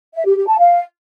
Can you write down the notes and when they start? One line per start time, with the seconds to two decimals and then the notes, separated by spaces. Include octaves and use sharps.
0.14 E5
0.25 G4
0.37 G4
0.48 A5
0.59 F5